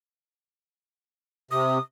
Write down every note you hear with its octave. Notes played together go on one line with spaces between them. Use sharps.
C3 D#6